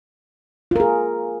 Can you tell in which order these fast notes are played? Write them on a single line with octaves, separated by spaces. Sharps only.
F4 A#4 G#4